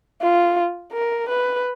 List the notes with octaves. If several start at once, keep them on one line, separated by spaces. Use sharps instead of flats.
F4
A#4
B4